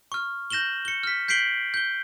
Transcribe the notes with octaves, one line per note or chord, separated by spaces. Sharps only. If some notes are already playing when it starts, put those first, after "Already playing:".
C#6 F6
G6 A#6 E7 F#7 G7
C#7 G7
F6 B6
G6 B6 C7 D7 F#7 G7
G6 G7